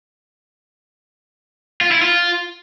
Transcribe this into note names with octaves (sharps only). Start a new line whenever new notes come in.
F4
E4
F4